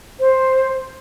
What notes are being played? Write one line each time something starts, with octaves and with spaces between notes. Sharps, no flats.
C5